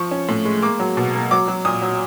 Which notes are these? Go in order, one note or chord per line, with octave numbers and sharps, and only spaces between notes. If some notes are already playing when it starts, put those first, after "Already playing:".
Already playing: F3 C#6
C#4
A2
G#3
A#3 D6
F#3
B2
A#3
F#3 D6
F#3
A#2 D#6
F#3